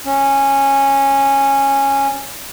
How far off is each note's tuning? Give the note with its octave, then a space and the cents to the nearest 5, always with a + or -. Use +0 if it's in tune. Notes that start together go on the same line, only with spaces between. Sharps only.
C#4 -10